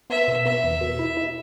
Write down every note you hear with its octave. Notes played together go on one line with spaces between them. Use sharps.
B3 E5
B2
B3 E5
E2
B2
E4
E4